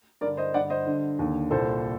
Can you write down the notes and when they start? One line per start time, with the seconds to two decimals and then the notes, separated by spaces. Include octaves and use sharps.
0.21 G2 A#4 D5
0.25 D3
0.37 C5 D#5
0.54 G2 D5 F#5
0.58 D3
0.70 C5 D#5
0.86 G2 D3
1.19 D#2 D3
1.51 C2 A#2 A4 C5